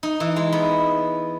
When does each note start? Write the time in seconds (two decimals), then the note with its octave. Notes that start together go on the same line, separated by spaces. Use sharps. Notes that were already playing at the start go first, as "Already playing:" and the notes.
0.03 D#4
0.20 E3
0.36 G#3
0.52 B3